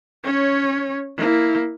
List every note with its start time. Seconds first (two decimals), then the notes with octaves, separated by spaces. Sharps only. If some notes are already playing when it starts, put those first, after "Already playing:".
0.24 C#4 C#5
1.17 A#3 E4